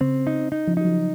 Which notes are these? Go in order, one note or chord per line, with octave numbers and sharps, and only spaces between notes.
C#3 C4
D#4
D#4
C#3 F3
F#3 D#4
C#3 F3